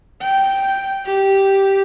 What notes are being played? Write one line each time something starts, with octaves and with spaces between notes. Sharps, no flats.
G5
G4